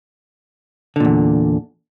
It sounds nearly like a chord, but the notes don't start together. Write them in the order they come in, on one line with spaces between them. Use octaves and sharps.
D3 A#2 E2